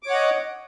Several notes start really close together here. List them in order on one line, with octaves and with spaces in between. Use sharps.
D6 C#5 F#5 D#5